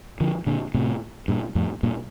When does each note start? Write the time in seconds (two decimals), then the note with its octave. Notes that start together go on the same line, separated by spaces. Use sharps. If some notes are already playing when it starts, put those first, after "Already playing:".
0.20 D3 F3
0.47 A#2 D3
0.74 A2 C3
1.28 G2 A#2
1.55 F2 A2
1.83 G2 A#2